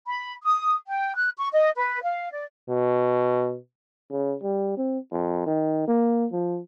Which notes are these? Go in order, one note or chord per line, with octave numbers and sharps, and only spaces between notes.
B5
D#6
G5
F#6
C#6
D#5
B4
F5
D5
B2
C#3
G3
C4
F2
D#3
A#3
F3